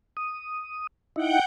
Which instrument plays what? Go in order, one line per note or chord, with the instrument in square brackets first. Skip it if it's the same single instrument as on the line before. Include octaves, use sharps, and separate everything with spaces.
[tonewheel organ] D#6
[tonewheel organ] D#4 E4 [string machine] F#5 G5 G6